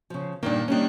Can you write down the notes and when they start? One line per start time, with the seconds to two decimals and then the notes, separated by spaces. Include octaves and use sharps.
0.10 C#3 F3
0.43 G2 A#2 D#3 A#3 D4
0.68 D#3 G3 A#3 C#4 D4